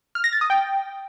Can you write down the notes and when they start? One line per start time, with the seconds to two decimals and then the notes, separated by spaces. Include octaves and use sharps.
0.15 F6
0.24 A#6
0.33 A6
0.41 D#6
0.50 G5